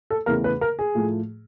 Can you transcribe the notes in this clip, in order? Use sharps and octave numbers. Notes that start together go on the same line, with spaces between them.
A4
E2 C#3 E3 A3 A#4
B4
A#4
G#4
A2 F3 A3